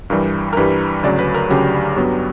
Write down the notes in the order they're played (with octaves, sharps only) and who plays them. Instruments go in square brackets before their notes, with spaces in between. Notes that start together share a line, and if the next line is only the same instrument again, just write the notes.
[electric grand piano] G2 E3 G3 [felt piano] A#4
[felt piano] A#4
[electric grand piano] G2 E3 G3 [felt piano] B4
[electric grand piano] D2 C#3 F#3 [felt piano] D5
[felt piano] B4
A#4
[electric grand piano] D2 C#3 F#3 [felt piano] G4
[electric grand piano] G2 F#3 B3